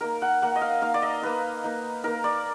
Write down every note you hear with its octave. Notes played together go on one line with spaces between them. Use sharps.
A#3 D#4 A#4
F#5
A#3 D#4 F#5
D#5
F5
A#3 D#4 F5
D5
D#5
A#3 D#4 B4
A#3 D#4
A#3 D#4 A#4
D5